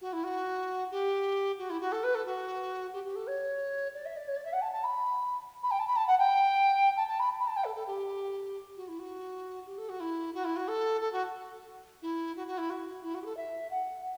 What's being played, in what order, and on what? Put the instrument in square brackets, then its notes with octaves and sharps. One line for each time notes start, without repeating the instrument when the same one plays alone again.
[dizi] F#4
E4
F#4
G4
F#4
E4
F#4
A4
B4
A4
F#4
G4
G4
A4
C#5
D5
E5
D5
C#5
D5
E5
F#5
A5
A5
B5
B5
G5
A5
B5
A5
F#5
G5
A5
A5
B5
B5
A5
G5
A4
A4
G4
F#4
E4
F#4
G4
A4
F#4
E4
F#4
E4
F#4
A4
A4
F#4
E4
F#4
F#4
E4
F#4
E4
F#4
G4
A4
E5
F#5